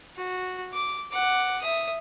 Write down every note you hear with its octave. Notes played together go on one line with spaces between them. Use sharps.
F#4
D6
F#5 D6
E5 D#6